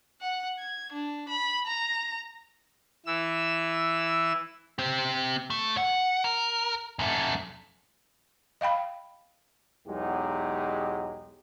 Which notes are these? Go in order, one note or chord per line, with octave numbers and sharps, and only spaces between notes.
F#5
G#6
D4
B5
A#5
E3 E6
C4 G4
A3
F#5
A#4
F#2 A3
D#5 F5 G5 B5
B1 E2 F#3 G#3 D#4 G4